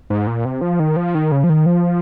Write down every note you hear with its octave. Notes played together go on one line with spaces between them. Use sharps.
G#2
A#2
C3
F3
D#3
F3
D#3
C#3
F3
D#3
F3